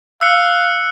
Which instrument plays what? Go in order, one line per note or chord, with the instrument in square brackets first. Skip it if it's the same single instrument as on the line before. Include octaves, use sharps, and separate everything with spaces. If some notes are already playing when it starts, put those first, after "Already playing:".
[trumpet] F5 [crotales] E6 F#6 C#7